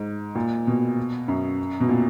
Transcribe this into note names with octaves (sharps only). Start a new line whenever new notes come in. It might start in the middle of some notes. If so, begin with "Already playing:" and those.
Already playing: G#2
A#2
B2
F#2
B2
A#2